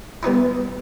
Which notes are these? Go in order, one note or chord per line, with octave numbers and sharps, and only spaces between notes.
G3 B3 D#4 E4